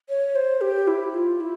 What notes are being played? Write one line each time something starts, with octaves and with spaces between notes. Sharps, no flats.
C#5
C5
G4
E4
F4
E4